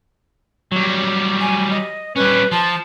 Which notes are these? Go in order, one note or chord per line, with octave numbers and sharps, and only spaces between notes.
F#3 G3
G#5
D#5
G3 C#4 B4
F3 A5